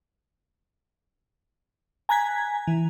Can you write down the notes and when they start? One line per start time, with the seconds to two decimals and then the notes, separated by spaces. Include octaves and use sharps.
2.09 G#5 A#5 F#6 G#6 B6
2.67 E3